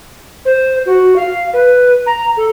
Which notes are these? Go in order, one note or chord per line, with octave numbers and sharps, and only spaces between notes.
C5
F#4
F5
B4
A#5
A4